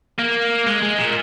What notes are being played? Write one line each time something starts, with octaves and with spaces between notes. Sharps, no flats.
A#3
G#3
G#3
A#2